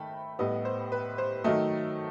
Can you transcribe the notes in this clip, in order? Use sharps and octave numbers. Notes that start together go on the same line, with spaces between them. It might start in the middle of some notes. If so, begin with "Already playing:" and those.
Already playing: D#3 A3 G5 A5 B5
A2 G3 B3 D#5
C5
B4
C5
D#3 F#3 A3 D#5